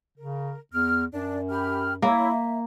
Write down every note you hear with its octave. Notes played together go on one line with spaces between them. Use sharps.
C#3 A#4
E2 F6
F#2 D4
G4 B5 F6
A#3 E4 C#5 B5
E5